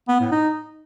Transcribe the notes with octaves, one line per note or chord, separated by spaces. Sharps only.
B3
A2
D#4